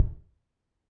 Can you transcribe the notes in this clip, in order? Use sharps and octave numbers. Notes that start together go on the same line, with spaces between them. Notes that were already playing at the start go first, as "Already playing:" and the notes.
Already playing: E4